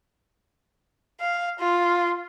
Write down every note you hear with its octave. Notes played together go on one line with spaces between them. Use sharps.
F5
F4